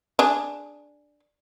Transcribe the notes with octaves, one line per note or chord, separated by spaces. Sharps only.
D4 G#4